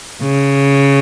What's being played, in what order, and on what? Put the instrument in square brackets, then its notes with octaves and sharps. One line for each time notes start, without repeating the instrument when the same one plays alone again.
[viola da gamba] C#3